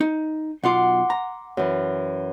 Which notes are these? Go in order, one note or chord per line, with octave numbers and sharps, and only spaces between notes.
D#4
B1 F4 F#5 C6 D6
A#5
F#2 E3